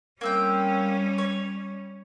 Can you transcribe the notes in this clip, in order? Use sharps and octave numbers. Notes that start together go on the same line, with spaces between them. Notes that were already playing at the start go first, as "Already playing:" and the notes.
G3 A#3 C4 C#4 G5
C#5